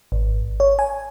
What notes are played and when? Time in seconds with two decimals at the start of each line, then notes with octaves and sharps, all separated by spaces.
0.12 G#1
0.60 C#5
0.79 G#5